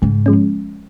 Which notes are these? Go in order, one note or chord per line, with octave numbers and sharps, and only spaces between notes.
G#2 C#3
F3 G#3 C#4